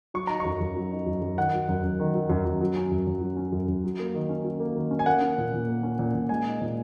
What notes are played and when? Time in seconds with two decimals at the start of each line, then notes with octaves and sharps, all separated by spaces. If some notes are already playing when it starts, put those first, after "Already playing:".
0.14 F#3 C#6
0.27 D#4 A#5
0.40 F#2 C#6
0.60 F#2
0.76 F#3
0.91 D#4
1.07 F#2
1.22 F#2
1.37 D#3 F#5
1.54 F#3
1.69 F#2
1.83 F#2
2.00 D#3
2.15 F#3
2.30 F#2
2.45 F#2
2.61 F#3
2.76 C#4
2.91 F#2
3.07 F#2
3.22 F#3
3.37 C#4
3.52 F#2
3.68 F#2
3.84 F#3
3.99 A#3
4.14 D#3
4.29 C#4
4.45 F#3
4.60 A#3
4.76 D#3
4.91 C#4
4.99 G#5
5.06 A#3 F#5
5.22 C#4
5.38 A#2
5.53 A#2
5.69 A#3
5.83 C#4
5.99 A#2
6.15 A#2
6.29 G#3 G#5
6.45 D#4
6.61 A#2